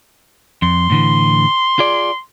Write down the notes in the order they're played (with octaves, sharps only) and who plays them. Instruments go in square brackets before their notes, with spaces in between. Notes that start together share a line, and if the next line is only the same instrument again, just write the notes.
[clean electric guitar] F2 [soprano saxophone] C6
[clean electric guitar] A2 D3 E3
F4 G#4 D5